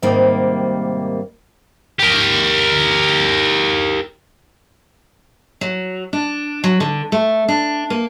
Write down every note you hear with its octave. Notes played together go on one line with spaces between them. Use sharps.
G#2 C3 D#3 G3 A#3
G4 A#4
F#3
D4
F#3
D3
A3
D4
A#3